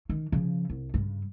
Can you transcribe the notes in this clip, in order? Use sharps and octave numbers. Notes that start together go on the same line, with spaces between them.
D#3
C#3 F3
C2
G2 C#3